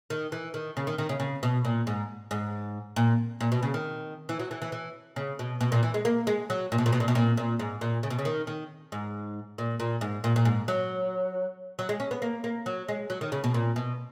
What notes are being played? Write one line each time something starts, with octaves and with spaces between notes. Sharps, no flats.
D#3
E3
D#3
C#3
D#3
D#3
C#3
C#3
B2
A#2
G#2
G#2
A#2
A#2
B2
C#3
D#3
E3
F#3
E3
E3
E3
C#3
B2
B2
A#2
E3
G#3
A#3
G#3
F#3
A#2
B2
A#2
B2
A#2
B2
A#2
A#2
G#2
A#2
C#3
B2
C#3
D#3
D#3
G#2
A#2
A#2
G#2
A#2
A#2
G#2
F#3
F#3
G#3
C#4
B3
A#3
A#3
F#3
G#3
F#3
D#3
C#3
B2
A#2
B2